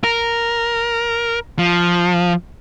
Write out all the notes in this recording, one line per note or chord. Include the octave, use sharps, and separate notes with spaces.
A#4
F3